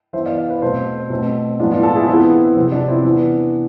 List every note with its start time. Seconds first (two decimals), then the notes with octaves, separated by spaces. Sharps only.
0.13 E3 C5 E5
0.17 B3
0.26 D5 F5
0.37 D5 F5
0.50 B4 D5
0.62 B2 A3 C4 A4 C5
1.10 B2 A3 C4
1.59 A2 F3 G#3 B3 D4 F4
1.71 D4 F4
1.83 F4 A4
1.95 E4 G#4
2.07 E3 B3 C4 E4
2.56 C3 F3 B3 C4
2.72 D4
2.88 C4 E4
3.04 E3 B3 D4